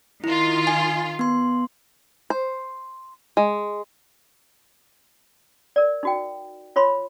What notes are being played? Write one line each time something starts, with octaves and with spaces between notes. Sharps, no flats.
D#3 E4 F4
G#5
B3 C6
C5
G#3
A#4 D5
D#4 F#4 G5
F4 C#5 B5 C6